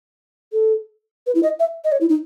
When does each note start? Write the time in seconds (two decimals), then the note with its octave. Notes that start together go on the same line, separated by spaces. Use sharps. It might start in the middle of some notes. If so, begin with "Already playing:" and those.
0.53 A4
1.27 B4
1.35 E4
1.43 D#5
1.60 E5
1.84 D#5
1.92 C#5
2.01 E4
2.09 D#4